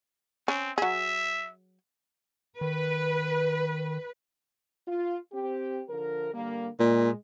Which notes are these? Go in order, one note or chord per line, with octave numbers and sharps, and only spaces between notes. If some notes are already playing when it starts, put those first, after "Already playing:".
C4 C#4
F#3 G#4 E5
D#3 B4
F4
C4 G4
D3 F3 A#4
D3 G3 A#3
A#2 G#3